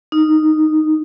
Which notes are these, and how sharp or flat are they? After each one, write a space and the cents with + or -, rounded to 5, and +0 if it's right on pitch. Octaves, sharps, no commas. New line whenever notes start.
D#4 -5